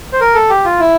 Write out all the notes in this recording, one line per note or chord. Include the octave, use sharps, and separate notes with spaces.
C5
A#4
A4
G4
F4
E4